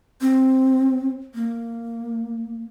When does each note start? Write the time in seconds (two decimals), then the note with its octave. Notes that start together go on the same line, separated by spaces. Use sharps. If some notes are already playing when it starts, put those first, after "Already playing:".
0.21 C4
1.35 A#3